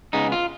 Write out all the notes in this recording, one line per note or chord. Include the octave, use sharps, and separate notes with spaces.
C#3 G#3 B3 D#4
F4